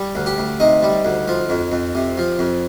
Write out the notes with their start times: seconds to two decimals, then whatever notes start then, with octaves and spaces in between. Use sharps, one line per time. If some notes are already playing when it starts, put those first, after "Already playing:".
Already playing: G3
0.15 D2
0.26 G4
0.38 D2
0.60 C3 D#4
0.82 G3
1.05 D2
1.28 F3
1.50 F2
1.72 F2
1.95 C3
2.18 F3
2.39 F2